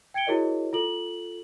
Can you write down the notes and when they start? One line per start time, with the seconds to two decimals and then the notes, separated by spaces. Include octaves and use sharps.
0.14 G5 G#6 C#7 D7 G7
0.27 E4 F#4 G#4 A#4 C#5 D#5
0.73 F4 A4 F#7